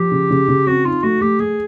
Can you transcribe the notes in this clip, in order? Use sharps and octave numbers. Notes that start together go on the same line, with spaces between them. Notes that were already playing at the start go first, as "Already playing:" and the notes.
Already playing: F3 G4
C#3
C#3
C#3
C4 F#4
D#4 F4
A3 F#4
A3 G4
A3 G#4